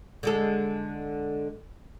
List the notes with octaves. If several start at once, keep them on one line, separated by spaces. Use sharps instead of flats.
D3 G#3 A4